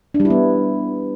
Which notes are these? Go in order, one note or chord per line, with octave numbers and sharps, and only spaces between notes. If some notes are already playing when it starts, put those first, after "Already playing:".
D4
G3
E4
B3